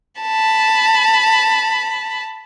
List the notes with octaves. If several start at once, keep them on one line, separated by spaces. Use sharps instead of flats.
A5 B5